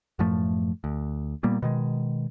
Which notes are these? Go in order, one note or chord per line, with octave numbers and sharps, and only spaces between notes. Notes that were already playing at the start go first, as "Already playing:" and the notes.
F#2 A2 F3 A3
D2
A#2 G3 A#3 B3
B2 D#3 G#3